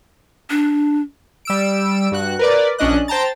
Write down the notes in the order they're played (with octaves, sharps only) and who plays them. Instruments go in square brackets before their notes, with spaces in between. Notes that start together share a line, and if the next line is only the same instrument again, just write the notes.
[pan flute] D4
[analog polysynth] G3 E6 D7
G2 F#4 F#6
A#4 B4 D5
A#1 C#4 D4 D#5 F#6
C5 G5 A5 A#5 A6